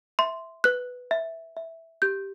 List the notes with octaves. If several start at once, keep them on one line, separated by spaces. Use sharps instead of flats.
E5 C6
B4 F#6
E5
E5
G4 G6